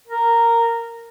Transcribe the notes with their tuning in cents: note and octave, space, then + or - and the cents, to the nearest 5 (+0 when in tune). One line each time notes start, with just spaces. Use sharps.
A#4 -10